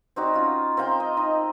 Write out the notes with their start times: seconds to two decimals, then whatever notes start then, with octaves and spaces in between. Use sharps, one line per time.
0.16 C4 D#4 F#4 D5
0.34 C#4 F4
0.77 C4 A#4 F5 G5
1.00 D#5
1.17 D#4